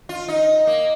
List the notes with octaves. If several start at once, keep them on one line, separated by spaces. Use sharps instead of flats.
F4
D#4
A#3